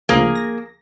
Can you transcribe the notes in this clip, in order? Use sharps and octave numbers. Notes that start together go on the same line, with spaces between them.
D2 C#3 F3 A#3 G#4
A#6